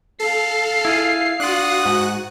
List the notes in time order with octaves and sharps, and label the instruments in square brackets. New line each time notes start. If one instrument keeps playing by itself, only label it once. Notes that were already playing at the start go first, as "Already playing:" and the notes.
[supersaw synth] A4 [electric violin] F5 C7
[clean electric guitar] E4 F4 G#4
[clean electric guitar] D4 F4 [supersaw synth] F#4 F#5 F#6 [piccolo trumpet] D#6
[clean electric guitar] G#2